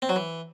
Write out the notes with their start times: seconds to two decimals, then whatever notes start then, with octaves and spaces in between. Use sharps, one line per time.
0.02 C4
0.09 F#3
0.16 E3